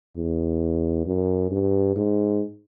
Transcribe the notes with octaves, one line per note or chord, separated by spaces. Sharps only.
E2
F#2
G2
G#2